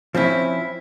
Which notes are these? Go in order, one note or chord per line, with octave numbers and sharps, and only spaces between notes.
F3 C4 C#4 E4